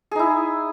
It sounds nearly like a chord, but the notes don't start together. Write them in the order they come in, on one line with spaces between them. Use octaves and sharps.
G#4 D#4 E4